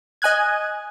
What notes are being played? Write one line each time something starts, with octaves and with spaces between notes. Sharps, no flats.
D#5 G#5 F#6 G#6